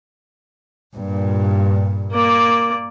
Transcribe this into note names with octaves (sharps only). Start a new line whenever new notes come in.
G2 A#2
A#3 D5